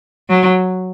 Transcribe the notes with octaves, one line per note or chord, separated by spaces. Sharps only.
F#3